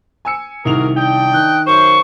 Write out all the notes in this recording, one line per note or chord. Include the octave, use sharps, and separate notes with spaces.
G#5 E6 C#7
C2 D#3 F#4 G#4 A#4 F7
D4 D#5 G5
D#3 F#6
F#2 C5 C#6